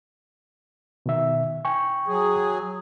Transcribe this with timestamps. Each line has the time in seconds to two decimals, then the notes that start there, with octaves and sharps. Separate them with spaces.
1.06 B2 D#3 E5
1.65 G5 G#5 C#6
2.07 F#3 G#4